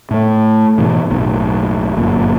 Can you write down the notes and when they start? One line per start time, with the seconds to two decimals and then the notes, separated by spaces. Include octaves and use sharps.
0.11 A2 A3
0.78 G#2 B2 E3 B3
1.10 B1 F#2 A2
1.96 G1 F#2 A#2